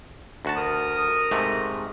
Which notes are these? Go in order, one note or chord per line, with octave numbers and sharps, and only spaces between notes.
D2 F#4 A5
A#4 D#6
G#2 C3 A3